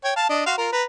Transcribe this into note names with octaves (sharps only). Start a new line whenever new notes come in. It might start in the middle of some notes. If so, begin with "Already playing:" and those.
C#5 G5
F5 A5
D4 D#5
F#4 F5 C6
F4 A#4
B4 A#5